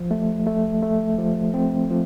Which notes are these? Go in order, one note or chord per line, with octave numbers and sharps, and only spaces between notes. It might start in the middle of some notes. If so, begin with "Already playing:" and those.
Already playing: F3
A3
A3
A3
F3
C4
F3